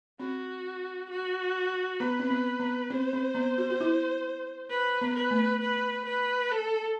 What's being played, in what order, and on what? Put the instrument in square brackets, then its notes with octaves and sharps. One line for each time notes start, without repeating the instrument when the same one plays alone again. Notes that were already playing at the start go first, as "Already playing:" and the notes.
[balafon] C4 [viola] F#4
[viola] F#4
[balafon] B3 [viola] B4
[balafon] C4
B3
B3
[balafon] C4 [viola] C5
[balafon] C4
B3
F#4
F#4
E4
[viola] B4
[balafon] B3
[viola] B4
[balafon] A3
[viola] B4
B4
A4